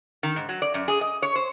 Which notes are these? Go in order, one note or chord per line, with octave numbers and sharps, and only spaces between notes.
D#3
G#2
F#3
D5
F#2
G#4
D#5
C#5
C5